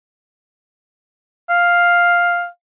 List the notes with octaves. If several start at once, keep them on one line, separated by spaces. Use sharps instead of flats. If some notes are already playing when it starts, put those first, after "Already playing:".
F5